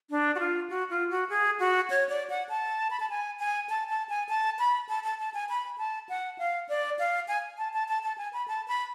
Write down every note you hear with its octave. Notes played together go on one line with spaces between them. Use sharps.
D4
F#4
F4
F#4
F4
F#4
G#4
F#4
C#5
D5
F#5
A5
B5
A5
G#5
G#5
A5
A5
G#5
A5
B5
A5
A5
A5
G#5
B5
A5
F#5
F5
D5
F5
G#5
A5
A5
A5
A5
G#5
B5
A5
B5